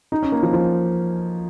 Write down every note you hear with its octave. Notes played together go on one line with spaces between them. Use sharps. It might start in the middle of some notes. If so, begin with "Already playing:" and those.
D#4
C#4
A#3
F3
F3